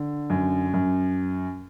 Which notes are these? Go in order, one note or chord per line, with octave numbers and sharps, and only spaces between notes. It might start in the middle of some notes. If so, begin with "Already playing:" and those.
Already playing: D3
F#2
F#2